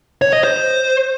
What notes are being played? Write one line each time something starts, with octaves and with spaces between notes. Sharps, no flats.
C#5
D#5
C5